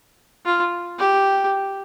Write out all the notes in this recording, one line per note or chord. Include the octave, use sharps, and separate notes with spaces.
F4
G4